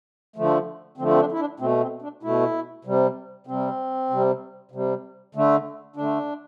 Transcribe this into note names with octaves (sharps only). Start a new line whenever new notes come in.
D3 F3 A3
D3 F3 A3 C4
C4
D4
E4
D4
B2 A3 C4
C4
D4
B2 A3 E4
C3 G3
C3 G3 C4
C3 G3
C3 G3
D3 A3
D3 A3 D4